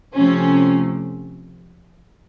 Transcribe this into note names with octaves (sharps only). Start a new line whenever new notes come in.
C3 F3 A3 C#4